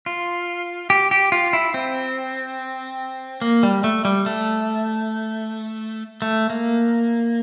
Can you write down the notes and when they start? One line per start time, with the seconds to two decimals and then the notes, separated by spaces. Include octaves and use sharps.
0.06 F4
0.90 G4
1.11 G4
1.32 F4
1.53 E4
1.74 C4
3.42 A#3
3.63 G3
3.84 A3
4.05 G3
4.26 A3
6.22 A3
6.50 A#3